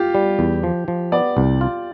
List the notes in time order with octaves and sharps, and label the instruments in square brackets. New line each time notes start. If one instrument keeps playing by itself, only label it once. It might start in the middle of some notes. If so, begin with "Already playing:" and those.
Already playing: [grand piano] F4 G4
[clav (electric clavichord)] G3
E2
F3
F3
[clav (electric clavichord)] B3 [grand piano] D5
[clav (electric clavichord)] C2
F4